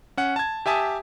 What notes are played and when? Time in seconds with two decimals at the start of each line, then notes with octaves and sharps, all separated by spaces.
0.17 C#4 F#5
0.36 A5 G#6
0.66 G4 E5 G#5 A5 D#6